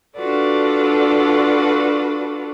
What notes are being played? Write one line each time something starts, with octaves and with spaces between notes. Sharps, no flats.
D4 F4 F#4 A4 B4 D5